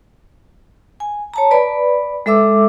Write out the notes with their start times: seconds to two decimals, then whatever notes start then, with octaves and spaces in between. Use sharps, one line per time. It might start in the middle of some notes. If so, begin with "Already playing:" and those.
1.00 G#5
1.34 C#5 A5 A#5
1.51 B4 D5 B5
2.26 G#3 A4 E5 D6 E6